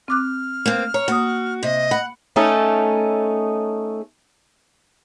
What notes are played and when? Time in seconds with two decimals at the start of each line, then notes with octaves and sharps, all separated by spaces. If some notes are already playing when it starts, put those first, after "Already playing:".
0.08 C4 D6 F6 F#6
0.66 A#3 C4
0.94 C#5 A#5
1.08 A#3 F#4 D#6
1.63 C3 D#5
1.91 F#5 B5
2.36 A3 C#4 D#4 A4